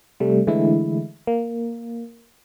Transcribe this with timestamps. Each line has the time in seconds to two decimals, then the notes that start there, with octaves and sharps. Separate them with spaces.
0.20 C3 G3 A3
0.47 D3 E3 G#3 A3 E4
1.27 A#3